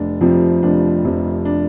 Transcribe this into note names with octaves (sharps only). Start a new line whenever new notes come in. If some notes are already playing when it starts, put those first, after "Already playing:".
Already playing: F1 D4
F2 C3 F3 C4
F1 D4
F2 C3 F3
D4